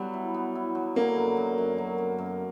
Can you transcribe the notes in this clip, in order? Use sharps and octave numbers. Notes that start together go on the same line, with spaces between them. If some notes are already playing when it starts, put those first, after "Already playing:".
Already playing: F#3 G3 B3
E4
B3
E4
F#3
D3 A#3
F#2
F#2
F#2
F#3
F#2
F#2